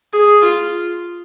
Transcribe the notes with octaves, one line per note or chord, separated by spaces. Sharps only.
G#4
F4